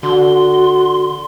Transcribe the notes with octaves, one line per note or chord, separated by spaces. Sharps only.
D3 F#4 C6